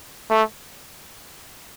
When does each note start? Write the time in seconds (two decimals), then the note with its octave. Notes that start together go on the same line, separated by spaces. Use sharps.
0.30 A3